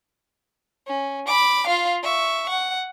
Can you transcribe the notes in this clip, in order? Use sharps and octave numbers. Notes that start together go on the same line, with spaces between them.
C#4
B5 D6
F4 F5
E5 C#6
F#5